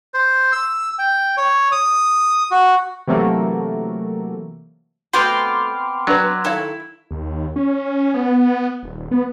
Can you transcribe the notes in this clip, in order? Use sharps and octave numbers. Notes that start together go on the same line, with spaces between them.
C5
E6
G5
C#5
D#6
F#4
C3 E3 F#3 A3 A#3
A3 B3 C4 F#4 G5 C6 D6 F6
F#3 D4 F#4 B4
D#3 E4 A4 F5
D#2
C#4
B3
D#1
B3